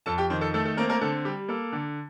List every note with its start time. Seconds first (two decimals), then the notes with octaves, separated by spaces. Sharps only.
0.06 F2 A4 A5
0.18 G4 G5
0.30 D#3 C4 C5
0.41 A4
0.54 A3 A4
0.66 A4
0.77 A#3 C4 A#4
0.89 A#3 A#4
1.01 D3 A4
1.25 G3 G4
1.49 A#3 A4
1.73 D3